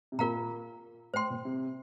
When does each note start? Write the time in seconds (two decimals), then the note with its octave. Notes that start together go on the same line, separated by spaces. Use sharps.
0.12 C3
0.18 A#2 F4 A#4 F5 A#5
1.13 A2 C5 G5 C6
1.30 A#2
1.45 C3